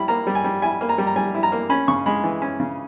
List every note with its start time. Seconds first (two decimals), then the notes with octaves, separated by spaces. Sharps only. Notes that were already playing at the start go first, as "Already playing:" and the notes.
Already playing: G3 E4 B5
0.08 A#3 A#5
0.27 G3
0.35 G#5
0.44 G3
0.62 E4 G#5
0.81 A#3
0.89 A#5
0.98 G3
1.07 A#5
1.16 G3 G#5
1.34 E4
1.43 A#5
1.52 A#3
1.70 C#4 B5
1.88 C#3 C#6
2.06 G#3 B5
2.24 E3
2.42 C#4
2.60 C#3